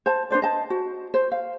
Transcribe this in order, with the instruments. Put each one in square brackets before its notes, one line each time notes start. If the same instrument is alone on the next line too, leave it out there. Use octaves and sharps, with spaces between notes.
[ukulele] C5 A5
D4 B4 C5 D5
D#5 A5
F#4
C5
F5